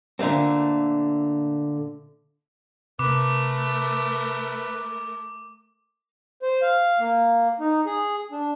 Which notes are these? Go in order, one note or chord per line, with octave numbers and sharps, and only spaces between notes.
A#2 D3 A3 A#3 C4
C3 A3 A#4 B4 D6
C5
F5
A#3
D#4
G#4
D4